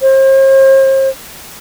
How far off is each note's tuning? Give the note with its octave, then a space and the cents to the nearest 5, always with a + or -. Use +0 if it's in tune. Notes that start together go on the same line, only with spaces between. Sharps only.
C5 +40